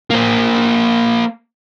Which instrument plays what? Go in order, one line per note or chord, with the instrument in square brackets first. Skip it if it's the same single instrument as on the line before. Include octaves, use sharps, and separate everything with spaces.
[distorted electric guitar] A#3 C5